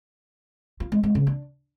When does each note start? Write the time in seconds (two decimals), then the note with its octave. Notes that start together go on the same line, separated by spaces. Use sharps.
0.80 F4
0.92 G#3
1.03 G#3
1.15 C#3
1.27 D4